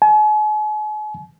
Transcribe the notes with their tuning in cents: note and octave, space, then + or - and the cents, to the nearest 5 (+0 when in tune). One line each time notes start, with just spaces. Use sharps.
G#5 +40